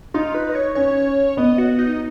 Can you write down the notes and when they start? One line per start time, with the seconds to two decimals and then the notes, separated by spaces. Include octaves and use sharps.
0.14 D#4 F4
0.35 B4
0.49 D#5
0.55 C#5
0.75 C#4 C#5
1.37 B3 D#5
1.58 F#4
1.79 D#4